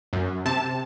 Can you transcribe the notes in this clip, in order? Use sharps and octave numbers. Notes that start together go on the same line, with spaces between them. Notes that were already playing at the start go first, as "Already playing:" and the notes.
F#2
C3 A5